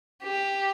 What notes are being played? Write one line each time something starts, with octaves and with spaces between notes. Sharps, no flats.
G4